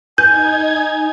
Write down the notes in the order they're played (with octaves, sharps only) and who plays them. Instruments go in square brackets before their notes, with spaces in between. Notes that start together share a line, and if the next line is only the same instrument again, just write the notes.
[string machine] D#4 G#6 [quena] G#5 [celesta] G6